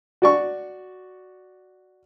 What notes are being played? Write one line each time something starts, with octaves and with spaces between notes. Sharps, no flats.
F#4 D5 C#6